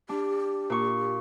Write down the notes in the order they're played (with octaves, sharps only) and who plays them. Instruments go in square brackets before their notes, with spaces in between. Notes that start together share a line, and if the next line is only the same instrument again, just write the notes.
[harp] D4 [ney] G4
[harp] A#2 C#6